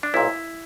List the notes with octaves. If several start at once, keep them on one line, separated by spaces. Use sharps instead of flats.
D4
B1 A#2 A#3 E4